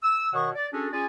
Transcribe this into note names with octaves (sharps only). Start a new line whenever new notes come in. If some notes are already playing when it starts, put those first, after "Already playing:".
E6
B2 D#3 C#5 F#5 C#6 D#6
D5
C#4 D4 F#4 G#4 A4
C#4 F4 G#4 D5 G#5